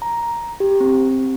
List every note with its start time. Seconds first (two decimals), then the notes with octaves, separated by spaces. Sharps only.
0.02 A#5
0.60 G4
0.80 C4